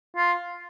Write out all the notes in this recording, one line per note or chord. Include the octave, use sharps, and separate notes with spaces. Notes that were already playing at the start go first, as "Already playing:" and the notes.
F4